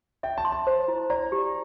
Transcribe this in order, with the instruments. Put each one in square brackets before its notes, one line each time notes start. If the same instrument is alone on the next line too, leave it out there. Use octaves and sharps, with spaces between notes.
[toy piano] E5 [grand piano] G5
[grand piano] A5
[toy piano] C6
[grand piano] A5
[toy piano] C5
E4
[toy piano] D5 [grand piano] A#5
[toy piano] G4